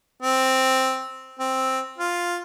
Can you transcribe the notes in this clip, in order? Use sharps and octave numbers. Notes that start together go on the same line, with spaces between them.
C4
C4
F4